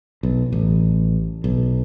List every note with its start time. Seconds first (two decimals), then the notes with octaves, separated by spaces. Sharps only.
0.23 B1
0.52 A1
1.44 B1